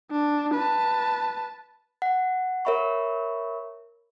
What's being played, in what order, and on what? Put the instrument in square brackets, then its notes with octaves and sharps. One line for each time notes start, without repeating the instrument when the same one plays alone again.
[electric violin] D4
B4 A5
[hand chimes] F#5
A#4 C#5 E5 B5 C#6